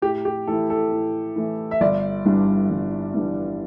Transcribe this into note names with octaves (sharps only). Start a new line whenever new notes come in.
A2 G4
G4
E3 A3 E4 A4
A4
A2
E3 A3 E4
E5
G1 D5
G2 E3 G3 D4
G1
G2 E3 G3 D4